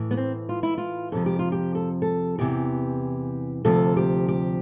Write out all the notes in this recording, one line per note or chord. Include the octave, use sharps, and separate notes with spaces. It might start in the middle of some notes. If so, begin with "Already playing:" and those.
Already playing: A2 E3
B3
C4
F4
E4
F4
F2 C3 F3 A4
G4
F4
G4
A4
A4
E2 C3 E3 G4
D2 C3 F3 A4
G4
G4